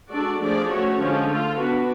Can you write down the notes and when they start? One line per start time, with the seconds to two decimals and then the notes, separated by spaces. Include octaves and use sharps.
0.11 G#3 D4 F#4 A4 D5
0.40 F3 A3 D4 G#4 D5
0.69 A3 C#4 F#4 C#5
0.98 D3 F3 G#3 C#4
1.27 A3 F4 A4
1.56 B3 D4 F#4 B4